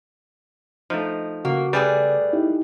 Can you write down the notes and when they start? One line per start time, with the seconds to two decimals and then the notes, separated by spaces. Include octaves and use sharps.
0.90 F3 A3 D#4
1.45 C#3 A#3 F#4
1.73 G3 A3 G#4 B4 D5
2.33 D#4 E4 G4